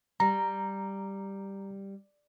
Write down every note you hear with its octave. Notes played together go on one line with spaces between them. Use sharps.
G3 A#5